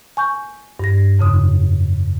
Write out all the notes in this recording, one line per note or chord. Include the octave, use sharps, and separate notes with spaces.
G#5 C#6 G6
G2 G4 A#6
F2 C#3 D#6